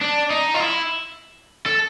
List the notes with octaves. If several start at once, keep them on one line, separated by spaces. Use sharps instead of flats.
D4
D#4
F4
E4
A4